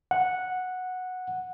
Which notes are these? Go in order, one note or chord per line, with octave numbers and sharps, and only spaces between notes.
F#5